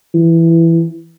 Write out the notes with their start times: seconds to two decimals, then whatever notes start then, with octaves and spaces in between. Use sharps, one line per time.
0.14 E3